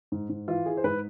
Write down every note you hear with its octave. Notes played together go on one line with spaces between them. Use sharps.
G#2
G#2
E3 F4
E3 G#4
C5
G#2 B4